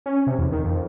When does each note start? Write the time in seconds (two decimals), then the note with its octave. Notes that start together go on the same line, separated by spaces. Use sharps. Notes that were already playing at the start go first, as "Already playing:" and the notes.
0.06 C#4
0.27 C3
0.38 E2
0.52 D#3
0.64 F2